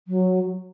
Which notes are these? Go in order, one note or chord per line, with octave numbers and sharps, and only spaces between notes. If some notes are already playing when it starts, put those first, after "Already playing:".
F#3